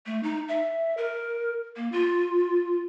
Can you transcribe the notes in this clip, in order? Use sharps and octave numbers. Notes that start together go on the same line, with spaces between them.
A3
D#4
E5
A#4
A#3
F4